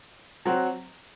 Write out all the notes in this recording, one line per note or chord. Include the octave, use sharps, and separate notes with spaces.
F#3 C4 F#4